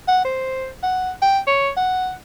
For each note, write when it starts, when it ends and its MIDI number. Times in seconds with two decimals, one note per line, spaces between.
0.08 0.24 78
0.25 0.70 72
0.83 1.11 78
1.22 1.39 79
1.47 1.71 73
1.77 2.14 78